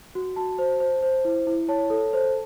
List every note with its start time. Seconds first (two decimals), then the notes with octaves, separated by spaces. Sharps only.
0.15 F#4
0.36 F#4 A5
0.59 C5
0.80 C5
1.03 C5
1.25 E4
1.47 E4
1.69 C#5 A5
1.90 A4
2.13 C5